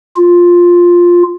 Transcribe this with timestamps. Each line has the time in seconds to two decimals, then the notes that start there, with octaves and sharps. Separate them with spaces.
0.17 F4